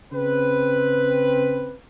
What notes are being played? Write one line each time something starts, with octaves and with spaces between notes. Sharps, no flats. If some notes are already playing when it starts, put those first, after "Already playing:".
C#3 C4 B4